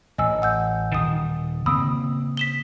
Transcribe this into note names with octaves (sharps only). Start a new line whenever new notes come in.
A1 D#5 G#5 E6
F#5 E6 G6
D#1 D#3 D#6
C#3 A#3 C4 B5 D#6 E6
B6 E7 G7